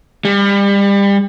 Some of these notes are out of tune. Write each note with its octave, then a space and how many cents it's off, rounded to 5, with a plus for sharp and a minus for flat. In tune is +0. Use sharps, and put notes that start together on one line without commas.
G3 +30